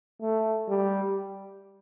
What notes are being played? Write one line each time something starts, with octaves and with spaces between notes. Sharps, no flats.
A3
G3